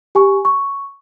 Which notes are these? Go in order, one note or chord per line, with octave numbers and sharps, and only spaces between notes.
G4 G#5 C#6
C#6